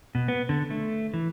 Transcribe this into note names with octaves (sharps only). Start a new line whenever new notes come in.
B2
B3
D3
A3
E3